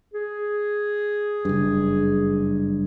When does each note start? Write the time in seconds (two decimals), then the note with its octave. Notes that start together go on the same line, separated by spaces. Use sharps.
0.13 G#4
1.45 F#1 G2